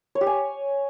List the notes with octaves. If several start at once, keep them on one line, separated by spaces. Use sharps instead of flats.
C#5
G4
G#5